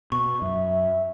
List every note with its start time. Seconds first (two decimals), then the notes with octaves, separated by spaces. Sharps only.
0.12 B2 C#6
0.42 F#2 E5